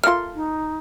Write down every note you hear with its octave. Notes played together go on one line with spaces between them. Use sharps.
A#3 F4 A4 E5 C6 F6
D#4